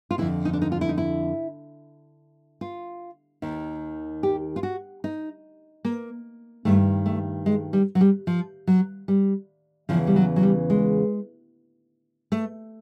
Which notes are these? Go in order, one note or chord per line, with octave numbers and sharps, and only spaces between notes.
F4
F2 D3 E4
D#4
D4
D#4
F4
E4
D#4
E4
F4
D#2 D#3
G4
F4
F#4
D#4
A#3
G2 D#3 A3
A3
G#3
G3
F#3
G3
F3
F#3
G3
E2 C#3 E3 F3
G3
F#3
F#3
G3
G#3
A3